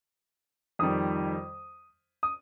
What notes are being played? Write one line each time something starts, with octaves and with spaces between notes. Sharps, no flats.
F2 D#3 G3 D#6
D#6